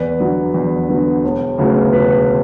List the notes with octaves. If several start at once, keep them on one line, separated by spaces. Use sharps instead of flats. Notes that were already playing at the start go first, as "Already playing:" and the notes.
Already playing: E2 B4 D5
D3 F#3 B3
E2
D3 F#3 B3
E1
D2 C#3 F#3 B3
E1 B4